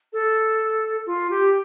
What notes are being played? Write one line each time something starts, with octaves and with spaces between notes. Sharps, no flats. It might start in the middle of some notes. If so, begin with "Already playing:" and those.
A4
F4
G4